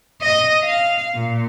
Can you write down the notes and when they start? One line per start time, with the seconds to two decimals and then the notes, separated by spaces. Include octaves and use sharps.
0.22 D#5
0.64 F5
1.15 A#2